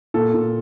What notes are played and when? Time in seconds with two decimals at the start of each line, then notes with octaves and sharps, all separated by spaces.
0.14 A#2 A4
0.34 A#2